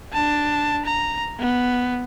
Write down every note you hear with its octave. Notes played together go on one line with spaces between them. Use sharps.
D4 A5
A#5
B3